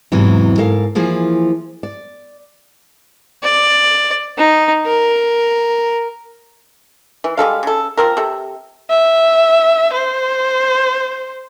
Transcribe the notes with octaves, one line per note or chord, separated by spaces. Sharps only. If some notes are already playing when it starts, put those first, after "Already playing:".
E2 G#2 C3 E3 F#3
G#2 A4 A#4 F5
E3 F3 A#3 G#4
D5
D5
D#4
A#4
E3
G3 G#3 A4 F5
C#3 A4
F3 C4 A#4
C3 A4
E5
C5